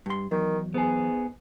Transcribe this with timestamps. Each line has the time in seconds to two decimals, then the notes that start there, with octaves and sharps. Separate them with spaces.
0.06 G2 C6
0.31 E2 D#3 F#3
0.74 G#2 B3 G#4